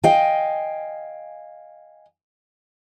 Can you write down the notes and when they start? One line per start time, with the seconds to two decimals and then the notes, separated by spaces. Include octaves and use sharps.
0.03 D#5 F5 G5 G#5